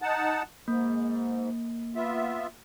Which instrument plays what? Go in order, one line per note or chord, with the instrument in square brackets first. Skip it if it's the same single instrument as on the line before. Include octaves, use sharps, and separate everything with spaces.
[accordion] D#4 F#5 A5
[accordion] G#2 [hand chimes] A#3
[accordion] B3 F4 E5